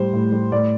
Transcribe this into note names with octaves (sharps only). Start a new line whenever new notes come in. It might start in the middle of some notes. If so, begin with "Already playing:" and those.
Already playing: A2 G3 C5
A2
G3
A2 D5